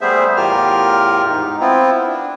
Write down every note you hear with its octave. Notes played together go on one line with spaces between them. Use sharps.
G3 A3 B3 G#4 C5 E5
E2 A2 F4 G4 A#4 F6
G#2 D#4
B3 C4 E4 F4
D4